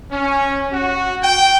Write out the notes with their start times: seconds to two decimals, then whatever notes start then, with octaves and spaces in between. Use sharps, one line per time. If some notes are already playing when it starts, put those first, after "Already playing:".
0.11 C#4
0.72 F#4
1.23 G5